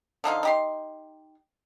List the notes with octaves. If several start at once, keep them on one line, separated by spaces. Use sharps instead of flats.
D3 F3 D#4 F4
D#4 G4 C6